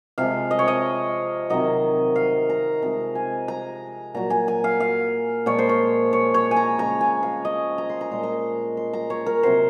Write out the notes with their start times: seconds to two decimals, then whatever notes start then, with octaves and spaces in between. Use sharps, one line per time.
0.18 C3 F3 G#3 F5
0.51 D#5
0.59 C#5
0.68 D#5
1.50 C3 D#3 F#3 D#5
2.16 F5
2.50 A#5
2.82 C3 F3 G#3 A#5
3.15 G#5
3.48 A#5
4.15 A#2 F#3 A#5
4.30 G#5
4.48 G#5
4.64 F5
4.80 F5
5.46 A#2 F3 G#3 C#5
5.59 C5
5.69 C#5
6.13 C#5
6.34 C#5
6.51 G#5
6.57 A#5
6.78 C#3 G#3 A#5
7.01 G#5
7.23 F5
7.45 D#5
7.78 A#5
7.89 C6
8.01 A#5
8.11 A#2 G#3 C6
8.23 A#5
8.77 C6
8.93 A#5
9.10 C#5
9.26 A#4
9.43 C3 F#3 C5